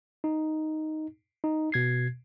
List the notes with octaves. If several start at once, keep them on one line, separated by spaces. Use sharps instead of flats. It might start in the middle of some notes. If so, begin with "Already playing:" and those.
D#4
D#4
B2 G#6 C7